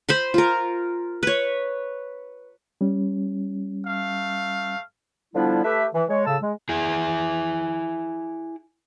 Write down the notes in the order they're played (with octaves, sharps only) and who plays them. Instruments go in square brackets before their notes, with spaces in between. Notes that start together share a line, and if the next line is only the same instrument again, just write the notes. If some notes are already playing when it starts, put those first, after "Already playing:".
[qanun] C5 B5 C6
F4 A#4
B4 C#5
[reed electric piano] G3 C#4
[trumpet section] A3 F5
[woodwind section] D3 F3 G3 B3 D4 E4
A3 G4 B4 E5
E3
G#3 C#5
A2 C#3 A5 E6
G#3
[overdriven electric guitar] E4 G#4